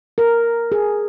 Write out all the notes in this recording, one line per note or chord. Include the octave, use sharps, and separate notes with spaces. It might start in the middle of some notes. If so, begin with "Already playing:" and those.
A#4
G#4